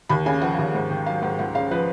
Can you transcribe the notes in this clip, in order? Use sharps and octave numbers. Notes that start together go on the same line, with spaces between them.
D#2 B5
C#3 G#5
F3 F#5
D#2
G#2
D#3
F#3 F5
G#2 F#5
C#2 F#5
C#3 F5
F3 B4